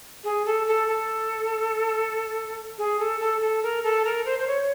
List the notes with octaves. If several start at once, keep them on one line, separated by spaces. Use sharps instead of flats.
G#4
A4
A4
A4
G#4
A4
A4
A4
A#4
A4
A#4
C5
C5
C#5